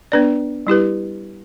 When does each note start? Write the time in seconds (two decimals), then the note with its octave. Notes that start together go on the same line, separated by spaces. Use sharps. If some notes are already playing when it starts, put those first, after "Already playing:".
0.12 B3 D4 B4 D5
0.67 G3 E4 G4 B4